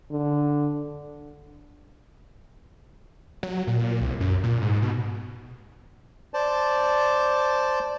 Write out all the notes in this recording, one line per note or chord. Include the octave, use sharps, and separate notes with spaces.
D3
F#3
A#2
C2
F#2
A#2
G#2
B2
C5 D5 A5